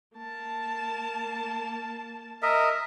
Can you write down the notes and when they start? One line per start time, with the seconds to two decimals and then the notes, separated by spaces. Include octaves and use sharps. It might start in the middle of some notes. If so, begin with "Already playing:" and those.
0.16 A#3 A5
2.43 A#4 D#5 E5